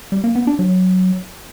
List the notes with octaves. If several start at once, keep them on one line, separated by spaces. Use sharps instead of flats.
G3
A#3
B3
D4
F#3